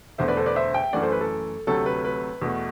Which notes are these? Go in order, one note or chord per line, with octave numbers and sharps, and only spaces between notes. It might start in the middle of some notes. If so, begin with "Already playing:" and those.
E1 E2 D3 A3 C5 E5
B4 D5
A4 C5
B4 D5
C5 E5
E5 G5
F#2 E3 A3 D5 F#5
A4 C5
B4
A4
D2 C3 F#3 A3 A4
B4
B4
E2 B2 A3